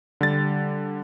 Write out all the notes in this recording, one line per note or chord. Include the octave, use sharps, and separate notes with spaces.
D3 G3 A6